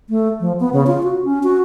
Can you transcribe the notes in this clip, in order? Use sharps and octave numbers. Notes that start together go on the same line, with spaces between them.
A3
F3
B3
C#3
F4
F#4
C#4
F#4